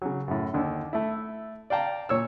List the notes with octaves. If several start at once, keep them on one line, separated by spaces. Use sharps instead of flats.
C#3 F#3
F#2 A2
D#2 D3 D4
A3 E4
D5 F5 G5 A5 A#5
A#2 C#5 E6